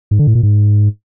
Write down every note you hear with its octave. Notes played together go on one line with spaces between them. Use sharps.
G#2
D3
A2
A#2
G#2